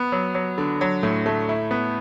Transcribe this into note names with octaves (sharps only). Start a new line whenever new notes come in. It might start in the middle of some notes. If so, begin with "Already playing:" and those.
Already playing: B3
F#3
F#3
D3
F#3
A2
A3
E4
B3